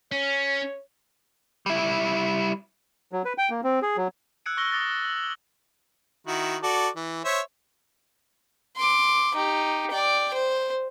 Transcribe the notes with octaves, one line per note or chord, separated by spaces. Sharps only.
C#4 C#5
G3 E4
F#3
B4
G5
A#3
C4
G#4
F#3
E6 F#6 G#6 C#7 D7
C#6 E6 F6 G#6 A#6 G7
D6 D#6 F6 F#6 A6 A#6
F#6
F#7
G7
D#3 E4 F#4
F#4 A4 D5
E3
C5 C#5 E5
C6 D6
D#4 G4
D5 G5
C5